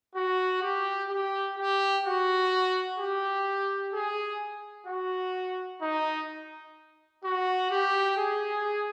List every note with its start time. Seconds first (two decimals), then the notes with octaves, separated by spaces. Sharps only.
0.16 F#4
0.62 G4
1.10 G4
1.57 G4
2.05 F#4
2.99 G4
3.94 G#4
4.87 F#4
5.82 D#4
7.24 F#4
7.71 G4
8.18 G#4